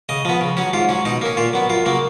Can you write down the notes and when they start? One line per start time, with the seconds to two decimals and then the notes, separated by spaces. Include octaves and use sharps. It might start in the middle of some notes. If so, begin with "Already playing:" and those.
0.09 C#3 D#5
0.25 F3 B3
0.41 C#3
0.57 F#3 C#4
0.73 G#2 F4
0.89 F#3 C#4
1.05 B2 D#4
1.22 A#3 C#4
1.37 A#2 F4
1.53 F#3 B3
1.69 F#2 F4
1.86 C#3 F#3 A#3